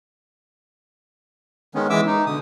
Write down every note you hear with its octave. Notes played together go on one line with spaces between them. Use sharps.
D#3 G#3 B3 C#4
E3 G#3 E5 D6 E6
D#4
B2 D3 D#6